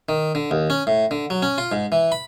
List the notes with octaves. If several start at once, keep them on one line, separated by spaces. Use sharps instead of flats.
D#3
D3
D#2
C#4
A2
D3
F#3
C#4
F4
G#2
E3
B5